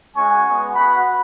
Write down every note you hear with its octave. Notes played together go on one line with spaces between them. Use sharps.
G#3 C#4 F#4 G#5 C#6
G#3 B3 F#4
B3 F#4 F#5 B5